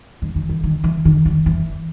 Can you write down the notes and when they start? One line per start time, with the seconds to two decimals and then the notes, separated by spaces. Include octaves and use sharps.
0.22 D#3
0.36 D#3
0.49 E3
0.64 D#3
0.84 E3
1.05 D#3
1.25 D#3
1.46 E3